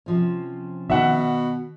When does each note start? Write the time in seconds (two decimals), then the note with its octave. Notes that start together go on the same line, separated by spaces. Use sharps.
0.06 C3 F3 C#4
0.90 B2 D#3 E5 F#5